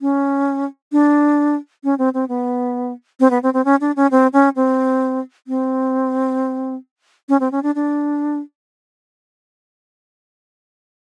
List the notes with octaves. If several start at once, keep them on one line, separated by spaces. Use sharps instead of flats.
C#4
D4
C#4
C4
C4
B3
C4
B3
C4
C4
C#4
D4
C#4
C4
C#4
C4
C4
C#4
C4
C#4
D4
D4